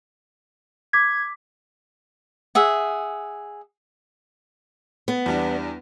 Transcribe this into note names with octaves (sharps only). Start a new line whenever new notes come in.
D6 G#6 B6
G#4 E5 F#5
B3
E2 G3 D4